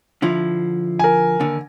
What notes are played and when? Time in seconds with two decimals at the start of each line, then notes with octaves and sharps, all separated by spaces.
0.22 D3 F3 E4
0.99 A#4 G#5
1.40 D#2 D3